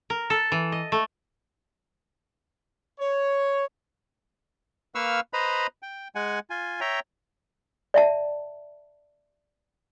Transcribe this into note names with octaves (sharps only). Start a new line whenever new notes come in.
A#4
A4
E3
D#5
A3
C#5
A#3 B4 F5 C#6 E6 F6
B4 C5 D#5 A#5 B5
G5
G#3 F#5 G#5
F4 G#5
C#5 E5 G5 A#5
D5 E5 A5